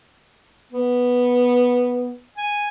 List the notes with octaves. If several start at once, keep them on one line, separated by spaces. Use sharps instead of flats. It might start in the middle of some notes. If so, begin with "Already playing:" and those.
B3
G#5